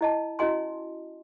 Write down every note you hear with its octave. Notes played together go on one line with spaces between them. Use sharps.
E4 D#5 A5
C#4 E4 F#4 D#5 G#5 C6